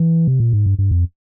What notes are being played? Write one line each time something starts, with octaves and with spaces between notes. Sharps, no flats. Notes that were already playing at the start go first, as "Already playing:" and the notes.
Already playing: E3
C3
A#2
G#2
G2
G2
F2